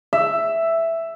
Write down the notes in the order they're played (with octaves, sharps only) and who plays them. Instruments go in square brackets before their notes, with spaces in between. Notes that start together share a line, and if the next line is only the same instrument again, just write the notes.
[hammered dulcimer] E5